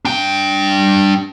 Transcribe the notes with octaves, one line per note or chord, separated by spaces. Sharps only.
D4 G5